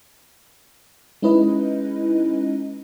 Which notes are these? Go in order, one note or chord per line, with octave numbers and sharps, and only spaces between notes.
G#3 C#4 D#4 E4 B4 D#5